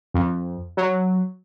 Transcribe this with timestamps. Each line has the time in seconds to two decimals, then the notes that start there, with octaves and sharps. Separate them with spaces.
0.14 F2
0.77 F#3